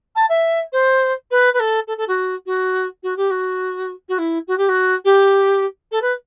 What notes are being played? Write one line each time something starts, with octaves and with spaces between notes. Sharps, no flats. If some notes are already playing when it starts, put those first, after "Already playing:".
A5
E5
C5
B4
B4
A4
A4
A4
F#4
F#4
F#4
G4
F#4
F#4
E4
F#4
G4
F#4
G4
A4
B4